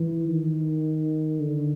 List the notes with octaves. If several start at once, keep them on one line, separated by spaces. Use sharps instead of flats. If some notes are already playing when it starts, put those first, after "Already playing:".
Already playing: E3
D#3
D3